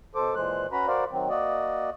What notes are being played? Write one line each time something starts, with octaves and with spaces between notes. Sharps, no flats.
B2 A4 C5 D6
A#2 E3 G#3 C5 F#6
C#4 F#4 B4 A#5 B5
F#4 A#4 C5 D5 F5
D#3 F#3 C4
A#3 F#4 D5 D#5